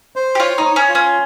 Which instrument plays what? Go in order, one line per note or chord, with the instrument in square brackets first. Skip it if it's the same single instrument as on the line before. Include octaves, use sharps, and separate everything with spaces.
[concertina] C5
[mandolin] G4
[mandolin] F4 [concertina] C#5
[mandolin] D#4
[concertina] C#5
[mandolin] C#4
[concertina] F4
[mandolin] C#4